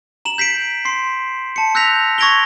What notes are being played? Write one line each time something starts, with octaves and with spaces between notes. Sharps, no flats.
A#5 E7 F#7
G6 B6 C7 D7
C6 C7
A5 C#7
E6 F#6 G6 A#6 B6 F7
C#6 G#6 A#6 D7 F7 G7